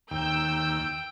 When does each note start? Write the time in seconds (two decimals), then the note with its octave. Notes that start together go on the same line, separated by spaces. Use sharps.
0.11 D#2 G5 E6 G6